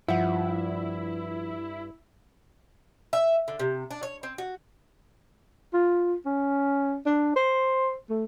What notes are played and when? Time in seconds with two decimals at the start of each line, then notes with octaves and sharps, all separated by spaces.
0.08 G2 F3 E4 E5 F#5
3.13 E5
3.48 D3
3.59 C3
3.91 D4
4.03 C#5
4.23 C4
4.38 F#4
5.73 F4
6.26 C#4
7.06 D4
7.36 C5
8.10 A3